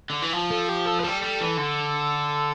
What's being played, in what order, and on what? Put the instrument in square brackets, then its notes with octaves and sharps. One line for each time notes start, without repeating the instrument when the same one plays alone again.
[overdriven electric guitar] D3
E3
F3
[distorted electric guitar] A4
G4
A4
B4
[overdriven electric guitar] G3 [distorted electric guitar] A4
[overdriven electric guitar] G3
E3
D3